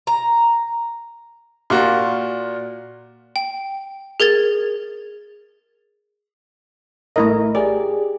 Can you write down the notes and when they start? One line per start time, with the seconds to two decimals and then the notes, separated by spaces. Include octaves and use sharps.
0.07 A#5
1.70 A#2 F4 F#4
3.36 G5
4.20 G#4 A#4 G#6 A6
7.16 A1 A3 E4 A#4 D#5
7.55 G4 G#4 D5